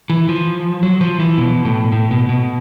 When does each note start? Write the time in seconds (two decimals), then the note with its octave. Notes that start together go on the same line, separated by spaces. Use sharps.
0.10 E3
0.29 F3
0.83 F#3
1.01 F3
1.19 E3
1.38 B2
1.65 A2
1.92 A2
2.11 B2
2.29 B2